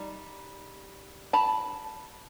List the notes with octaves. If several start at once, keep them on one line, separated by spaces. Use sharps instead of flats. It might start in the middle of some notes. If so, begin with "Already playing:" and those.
Already playing: G3 D#4
A5 B5